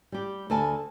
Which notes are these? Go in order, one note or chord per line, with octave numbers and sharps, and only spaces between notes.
G3 G4
D2 A4 G#5 A5